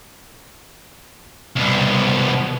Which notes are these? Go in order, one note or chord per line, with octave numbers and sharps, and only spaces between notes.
C2 B2